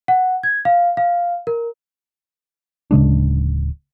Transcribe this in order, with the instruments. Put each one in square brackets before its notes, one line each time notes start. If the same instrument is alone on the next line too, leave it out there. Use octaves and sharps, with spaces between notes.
[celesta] F#5
G#6
F5
F5
A#4
[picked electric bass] D1 C#3 G#3 D4